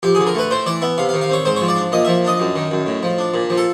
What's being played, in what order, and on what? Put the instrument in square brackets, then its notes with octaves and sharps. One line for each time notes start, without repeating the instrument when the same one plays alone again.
[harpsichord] F2 G4
D3 G#4
A#4
A3 B4
A2 C5
E3 D5
B3 E5
C3 F5
F5
D#3
F5
C4 C#5
G#2 C5
F3 C#5
D5
D4
A#2 D#5
F3 E5
D4 D#5
F#2
D#3
F#2
A2
F3
D4
A#2
F3
A4